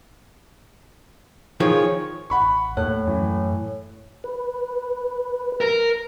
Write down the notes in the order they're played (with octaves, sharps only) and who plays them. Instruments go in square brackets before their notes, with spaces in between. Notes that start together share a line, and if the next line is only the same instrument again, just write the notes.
[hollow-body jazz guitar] D#3 F3 G#4 [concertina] C#5
[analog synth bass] A1 [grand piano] F#5 B5 C#6
[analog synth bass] D#2 [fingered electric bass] A2 [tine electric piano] C#5 [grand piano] F#6
[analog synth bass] F#2 [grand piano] E3
[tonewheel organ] B4
[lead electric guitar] A#4